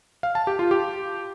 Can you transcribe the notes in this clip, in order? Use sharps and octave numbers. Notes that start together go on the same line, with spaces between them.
F5
A5
G4
F4
G4